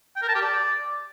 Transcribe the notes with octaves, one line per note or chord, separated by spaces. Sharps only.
G5
A#4
A5
G4
D5